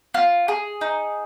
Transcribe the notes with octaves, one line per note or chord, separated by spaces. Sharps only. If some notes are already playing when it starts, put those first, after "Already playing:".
F4
G#4
D#4